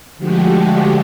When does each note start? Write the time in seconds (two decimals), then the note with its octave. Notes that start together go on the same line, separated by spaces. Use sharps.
0.18 D3 F3 G#3 A3 F#4 G4